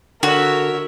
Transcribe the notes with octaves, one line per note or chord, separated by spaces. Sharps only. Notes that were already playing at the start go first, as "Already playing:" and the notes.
D3 F#4 A#4 C#5 E5